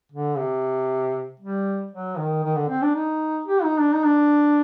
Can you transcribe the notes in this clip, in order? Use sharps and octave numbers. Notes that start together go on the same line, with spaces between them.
D3
C3
G3
F#3
D#3
D#3
D3
C4
D4
D#4
G4
D#4
D4
D#4
D4